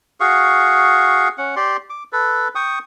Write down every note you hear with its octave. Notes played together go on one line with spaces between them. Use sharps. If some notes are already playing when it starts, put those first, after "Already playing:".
F#4 G#4 F5 C#6
C#4 F#5
G4 D5 C6
D6
A4 B4
G5 C#6 D#6